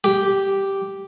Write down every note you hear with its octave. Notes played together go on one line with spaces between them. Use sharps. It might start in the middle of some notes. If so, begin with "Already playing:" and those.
G4